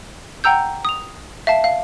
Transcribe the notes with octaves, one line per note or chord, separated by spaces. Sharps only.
F#5 G5 A#5 E6 G6
D#6 F7
E5 F5 A5
F5